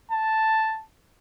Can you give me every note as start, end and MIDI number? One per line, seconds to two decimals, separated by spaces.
0.11 0.84 81